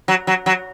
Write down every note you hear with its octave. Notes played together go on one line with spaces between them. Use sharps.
F#3
F#3
F#3